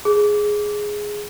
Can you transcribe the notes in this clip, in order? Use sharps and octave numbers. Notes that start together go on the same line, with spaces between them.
G#4